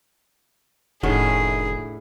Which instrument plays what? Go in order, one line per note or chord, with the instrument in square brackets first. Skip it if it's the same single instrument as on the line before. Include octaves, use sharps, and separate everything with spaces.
[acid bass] F1 [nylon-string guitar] A2 D4 F#4 [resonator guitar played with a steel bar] D#3 C#4 [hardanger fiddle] G#4